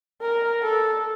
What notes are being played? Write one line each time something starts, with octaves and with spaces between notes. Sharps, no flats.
A#4
A4